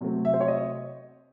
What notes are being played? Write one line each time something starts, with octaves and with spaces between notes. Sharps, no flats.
C3 F#3 A3 C4
E5
C5
C#5
D#5